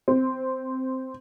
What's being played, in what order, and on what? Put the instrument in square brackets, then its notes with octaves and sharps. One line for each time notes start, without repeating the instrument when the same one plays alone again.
[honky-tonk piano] C4